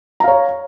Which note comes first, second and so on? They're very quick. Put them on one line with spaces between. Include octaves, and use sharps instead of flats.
A#5 F5 C#5